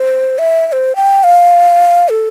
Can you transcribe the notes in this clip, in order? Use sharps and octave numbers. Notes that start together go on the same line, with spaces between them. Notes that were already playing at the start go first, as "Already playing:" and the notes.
Already playing: C5
E5
E5
C5
G5
F5
A4